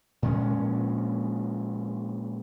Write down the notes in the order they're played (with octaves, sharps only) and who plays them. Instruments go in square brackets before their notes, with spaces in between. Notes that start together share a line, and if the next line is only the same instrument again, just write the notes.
[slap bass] A#2 F3 G#3 C#4